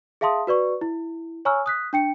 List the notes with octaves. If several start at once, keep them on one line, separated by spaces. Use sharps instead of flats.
G#4 E5 F5 A5 C6 D#6
F#4 B4 D5 C#6
E4
C#5 G#5 A#5 C#6 E6 F6
D#6 F#6 B6
D4 G5 C#7